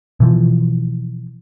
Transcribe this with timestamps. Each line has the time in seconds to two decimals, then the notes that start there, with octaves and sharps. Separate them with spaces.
0.20 B2 E3 F3